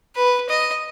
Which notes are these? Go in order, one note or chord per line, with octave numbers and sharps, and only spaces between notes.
B4
D#5